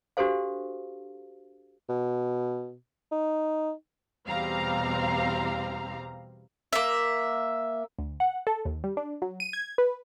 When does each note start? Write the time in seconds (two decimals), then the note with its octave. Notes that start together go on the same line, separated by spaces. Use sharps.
0.17 D4 F#4 G4 A4 C5 F5
1.89 B2
3.12 D#4
4.28 E2 B2 G3 C4 F5 A#5
6.73 A#3 E5
7.99 D2
8.20 F#5
8.47 A4
8.65 D#2
8.84 G3
8.97 D4
9.22 F#3
9.40 D#7
9.53 G#6
9.78 B4